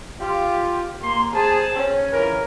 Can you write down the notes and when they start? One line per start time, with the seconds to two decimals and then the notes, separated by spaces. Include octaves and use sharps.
0.21 F4 G4
1.03 A#3 C6
1.35 G#4 C5 A5
1.75 C#4
2.12 E3 F4 A#4